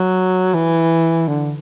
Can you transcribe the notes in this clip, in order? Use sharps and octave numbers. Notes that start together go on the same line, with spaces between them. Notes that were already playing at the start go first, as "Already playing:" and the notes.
Already playing: F#3
E3
D3